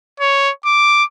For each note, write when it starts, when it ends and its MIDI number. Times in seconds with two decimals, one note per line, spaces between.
0.20 0.51 73
0.65 1.04 86